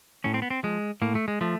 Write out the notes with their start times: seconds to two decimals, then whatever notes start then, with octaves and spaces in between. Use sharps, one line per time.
0.24 A2 C#4
0.34 C4
0.42 B3
0.50 C4
0.63 F3 G#3
1.02 A2 A#3
1.15 A3
1.28 G#3
1.41 F3 A3